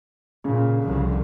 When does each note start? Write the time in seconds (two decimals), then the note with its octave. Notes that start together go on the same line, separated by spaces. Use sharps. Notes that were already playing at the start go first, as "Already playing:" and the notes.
0.44 A#2 C#3
0.81 C2 D3 F3